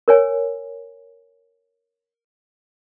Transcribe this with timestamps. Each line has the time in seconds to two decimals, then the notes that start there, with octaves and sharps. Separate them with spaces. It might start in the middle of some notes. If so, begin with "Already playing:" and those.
0.08 A#4 C#5 G#5